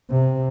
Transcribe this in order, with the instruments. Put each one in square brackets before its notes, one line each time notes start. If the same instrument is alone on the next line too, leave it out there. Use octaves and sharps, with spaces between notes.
[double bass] C3